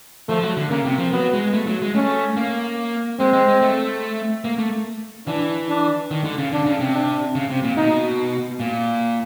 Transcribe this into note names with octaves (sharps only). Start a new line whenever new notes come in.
F3 A3
F#3
D3
C#3 A#3
C3
F3
F#3 B3
G#3
A3
F#3
G#3
A3 C#4
A#3
G#3 C4
G#3
G#3
A3
A#3
A3
E3 D4
D4
D#3
D3
C#3
D3 D4
C#3
C3
D4
C#3
C3
A#2
B2 D#4
A#2